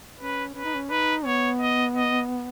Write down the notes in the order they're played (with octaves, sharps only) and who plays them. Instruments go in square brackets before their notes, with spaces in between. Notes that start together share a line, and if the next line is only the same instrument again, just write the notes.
[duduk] C#4 [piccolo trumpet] B4
[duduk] C#4 [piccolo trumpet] B4
[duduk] D#4
C#4
[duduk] D#4 [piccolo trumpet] B4
[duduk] B3 [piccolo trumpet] C#5
[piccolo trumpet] D#5
D#5